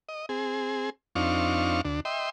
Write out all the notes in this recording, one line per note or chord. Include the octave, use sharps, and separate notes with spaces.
D#5
C4 G#4
F2 C4 D4 D#4 F5 C#6
D2 D4
D#5 E5 G5 C6